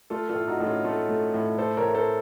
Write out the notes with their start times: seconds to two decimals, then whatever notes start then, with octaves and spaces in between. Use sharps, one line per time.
0.10 A3 F4 A4
0.29 F4 A4
0.35 A2
0.48 D#4 F#4
0.58 A2 D#4
0.66 C#4 F4
0.84 A3 F4 A4
1.09 A3
1.34 A2
1.58 A3 A4 C5
1.77 A#4 C#5
1.83 A2
1.94 A4 C5